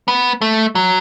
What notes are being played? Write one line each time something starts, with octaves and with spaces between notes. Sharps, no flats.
B3
A3
F#3